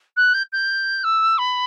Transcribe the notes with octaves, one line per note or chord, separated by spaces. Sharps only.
F#6
G6
G6
E6
B5